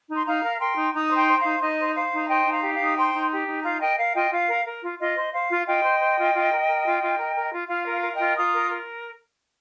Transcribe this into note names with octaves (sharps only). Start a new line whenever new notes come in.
D#4
C6
D#4 F5 A#5
A#4
A#4 G5 C6
D#4
D#4 A#5 D#6
C5
G5 C6
C5
F5 A#5
D#4
D#4 D#5
C5
C5 F5
D#4
A#5
C5 D#5 G5
D#4
F5 A#5
G4
F5 A#5
D#4
D#6
C5 G5 C6
D#4
G4
D#4
F4 F5 A#5
A#4 D#5 G5
A#4 F5
F4 D#5 G5
F4 F5
A#4
A#4
F4
F4 D#5
C5
C5 F5
F4
F4 D#5 G5
C5
C5
F4
F4
A#4
A#4
F4
F4
A#4
A#4
F4
F4 F5
A#4
F5
A#4
D#5 G5
F4
F4 A#5 D#6
A#4
A#4